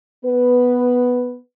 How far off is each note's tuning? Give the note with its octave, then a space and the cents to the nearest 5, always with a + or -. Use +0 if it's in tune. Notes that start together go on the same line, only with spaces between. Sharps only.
B3 +0 B4 +0